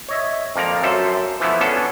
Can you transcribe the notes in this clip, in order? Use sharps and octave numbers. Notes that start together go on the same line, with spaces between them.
C#5 D#5 E5
F2 F3 A#3 D5 A#5
F#2 A4 C5 E5
E3 F3 A3 B3 E4
B3 C#4 D4 A4 A5